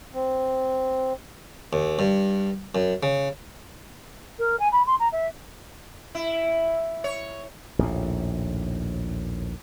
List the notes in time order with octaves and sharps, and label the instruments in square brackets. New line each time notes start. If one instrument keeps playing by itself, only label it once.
[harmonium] C4
[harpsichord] D#2
G2
F#2
C#3
[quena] A#4
G#5
B5
C6
A#5
E5
[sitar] E4
C#5
[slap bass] A#1 D#2 A2